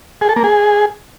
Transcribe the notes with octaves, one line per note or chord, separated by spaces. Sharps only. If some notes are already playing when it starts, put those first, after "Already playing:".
G#4
A4
A#3
G#4